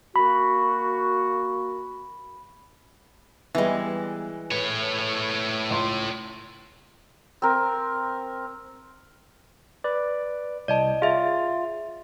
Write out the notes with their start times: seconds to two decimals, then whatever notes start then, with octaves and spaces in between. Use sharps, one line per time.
0.16 A#3 F#4 B5
3.55 E3 G3 G#3 B3
4.51 A2 B4 C#5
5.70 C#2 C6
7.42 C4 A#4
9.84 B4 D5
10.68 C2 D5 D#5 A5
11.02 F4 G#4 E5